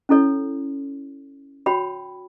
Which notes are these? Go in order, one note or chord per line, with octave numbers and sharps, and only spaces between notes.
C#4 E4 A4 C#5
F#4 C#5 G5 B5